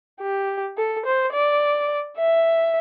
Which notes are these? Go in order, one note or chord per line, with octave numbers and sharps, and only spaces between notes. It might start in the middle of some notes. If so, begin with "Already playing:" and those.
G4
A4
C5
D5
E5